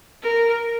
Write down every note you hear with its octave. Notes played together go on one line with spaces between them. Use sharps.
A#4